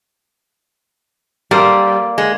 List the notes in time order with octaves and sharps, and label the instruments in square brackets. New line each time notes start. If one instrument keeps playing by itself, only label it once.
[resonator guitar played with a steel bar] G3 [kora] A#3 A4 C5
[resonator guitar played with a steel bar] G#3